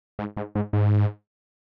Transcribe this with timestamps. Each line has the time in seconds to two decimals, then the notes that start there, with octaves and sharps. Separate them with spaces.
0.19 G#2
0.37 G#2
0.55 G#2
0.73 G#2